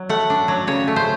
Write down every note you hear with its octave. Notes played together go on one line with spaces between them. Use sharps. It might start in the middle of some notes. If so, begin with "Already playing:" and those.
Already playing: F#3
A3 F#5
D4
F#3
C#3 C#5
A3
C5